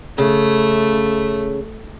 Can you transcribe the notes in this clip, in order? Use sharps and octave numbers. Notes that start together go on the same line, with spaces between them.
C#3 A3